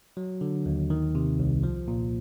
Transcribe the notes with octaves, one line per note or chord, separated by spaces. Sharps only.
F#3
D3
D#2
D#3
C3
C2
F3
A#2